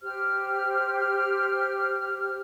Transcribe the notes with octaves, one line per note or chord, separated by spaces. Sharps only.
G4 C5 F6